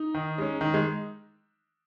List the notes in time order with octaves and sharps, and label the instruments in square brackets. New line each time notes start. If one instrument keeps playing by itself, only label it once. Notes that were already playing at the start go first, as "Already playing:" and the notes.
Already playing: [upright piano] D#4
[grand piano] D#3
G#3 C#4
D#3
[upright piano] G#3